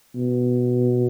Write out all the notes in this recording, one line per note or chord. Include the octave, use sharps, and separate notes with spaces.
B2